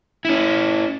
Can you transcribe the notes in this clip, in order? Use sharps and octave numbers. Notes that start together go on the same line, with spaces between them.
C#4 E4